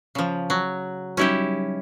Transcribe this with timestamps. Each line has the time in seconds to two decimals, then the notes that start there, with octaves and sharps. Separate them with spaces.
0.15 C#3 F3
0.50 F#3
1.17 F#3 G3 C#4 D#4 E4 G4